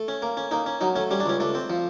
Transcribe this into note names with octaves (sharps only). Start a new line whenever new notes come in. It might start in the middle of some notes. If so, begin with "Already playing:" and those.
Already playing: A3
C#4
A#3
C#4
A#3 D#4
C#4
F#3 D#4
A3 C#4
G3 C#4
D4
C#2 C#4
A3 D4
C4
F3